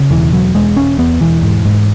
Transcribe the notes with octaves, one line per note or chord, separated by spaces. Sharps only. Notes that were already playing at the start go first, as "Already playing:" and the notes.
Already playing: C#3
E1 E3
E1 F#3
E1 G#3
E1 C#4
E2 B3
E1 E3
G#2
G#2